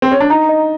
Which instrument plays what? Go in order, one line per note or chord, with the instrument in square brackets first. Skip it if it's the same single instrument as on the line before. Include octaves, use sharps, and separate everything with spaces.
[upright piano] C4
C#4
D4
[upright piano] D#4 [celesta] A#5
[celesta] D#5